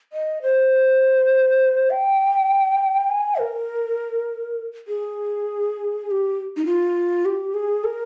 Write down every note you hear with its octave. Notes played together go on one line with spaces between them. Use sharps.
D#5
C5
G5
G#5
A#4
G#4
G#4
G4
D#4
F4
G4
G#4
A#4